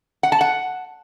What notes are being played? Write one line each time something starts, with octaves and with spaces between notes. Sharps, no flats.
F#5
A5
F#5